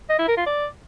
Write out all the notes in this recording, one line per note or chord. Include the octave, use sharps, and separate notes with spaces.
D#5
E4
A#4
F4
D5